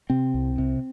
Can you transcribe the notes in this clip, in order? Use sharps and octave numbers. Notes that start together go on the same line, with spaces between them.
C3 C4
C2
C3